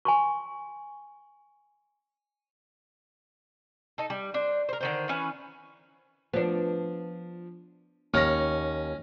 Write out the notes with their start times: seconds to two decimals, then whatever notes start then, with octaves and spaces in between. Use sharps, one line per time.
0.05 G#5 C6 C#6
3.98 D#4 A4
4.10 G3
4.34 D4 C5
4.69 A#4 C5
4.81 D3 D#3 C5
5.09 E3 C#4 B4
6.33 F3 B3 D4
8.14 D#2 C#4 F6 A#6